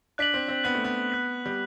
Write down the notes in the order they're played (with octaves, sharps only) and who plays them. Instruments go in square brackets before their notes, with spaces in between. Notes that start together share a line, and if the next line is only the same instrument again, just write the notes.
[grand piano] D4 [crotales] F#6 B6 F#7
[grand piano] C4
C4
[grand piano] B3 [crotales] F#6 B6 F#7
[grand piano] A3
B3
[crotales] F#6 B6 F#7
[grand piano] G3